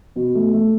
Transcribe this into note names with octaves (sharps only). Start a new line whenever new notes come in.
B2
A3
A3